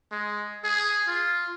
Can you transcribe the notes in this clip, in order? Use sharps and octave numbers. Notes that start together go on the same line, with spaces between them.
G#3
G#4
F4